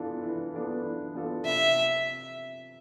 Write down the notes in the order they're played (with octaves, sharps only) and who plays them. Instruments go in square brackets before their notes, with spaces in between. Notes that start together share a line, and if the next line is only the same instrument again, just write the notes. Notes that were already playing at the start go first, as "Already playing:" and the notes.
Already playing: [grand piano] E3 B3 D4 F4 A4
E3
B3 D4 F4 A4
E3
B3 D4 F4 A4
[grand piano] C3 [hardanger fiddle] E5